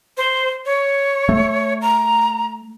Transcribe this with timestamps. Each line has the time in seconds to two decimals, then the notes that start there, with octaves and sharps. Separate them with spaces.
0.17 C5
0.66 C#5
1.29 A3
1.81 A#5